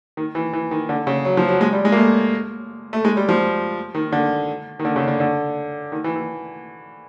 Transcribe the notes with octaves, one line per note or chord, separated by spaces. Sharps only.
D#3
E3
E3
D#3
D3
C#3
F#3
F3
F#3
G#3
G3
G#3
A#3
A3
A3
G#3
G3
F3
D#3
D3
D#3
D3
C#3
D3
D3
D#3
E3
E3